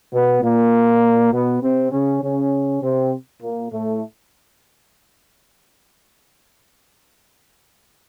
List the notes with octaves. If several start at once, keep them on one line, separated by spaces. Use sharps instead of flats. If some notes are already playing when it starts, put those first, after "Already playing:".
B2 B3
A#2 A#3
B2 B3
C3 C4
C#3 C#4
C#3 C#4
C3 C4
A#2 A#3
A2 A3